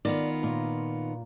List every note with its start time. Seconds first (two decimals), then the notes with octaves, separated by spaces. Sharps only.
0.05 D#3 B3 F4 D5
0.43 A#2